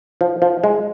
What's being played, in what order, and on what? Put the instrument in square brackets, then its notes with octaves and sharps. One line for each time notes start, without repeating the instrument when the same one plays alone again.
[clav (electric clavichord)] F3
F3
G#3